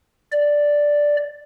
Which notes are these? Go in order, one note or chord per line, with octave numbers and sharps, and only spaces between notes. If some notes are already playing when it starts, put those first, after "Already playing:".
D5